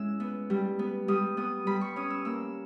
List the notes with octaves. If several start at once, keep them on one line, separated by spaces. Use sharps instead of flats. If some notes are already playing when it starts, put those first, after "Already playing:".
Already playing: G#3 C#4 E4 E6
B3
G3
B3
G3 D#6
B3 D#6
G3 B5
C#6
C#4 D#6
E6
A#3 E6